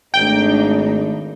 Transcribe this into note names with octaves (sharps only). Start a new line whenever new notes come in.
G#1 A3 D4 D#4 G5